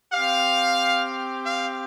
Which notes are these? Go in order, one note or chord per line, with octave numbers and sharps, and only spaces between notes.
C4 G4 F5
F5